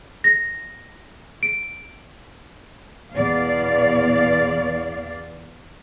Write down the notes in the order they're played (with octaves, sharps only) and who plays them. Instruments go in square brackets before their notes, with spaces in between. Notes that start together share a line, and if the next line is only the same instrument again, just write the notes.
[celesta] A#6
D7
[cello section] E2 B2 B3 D5 F5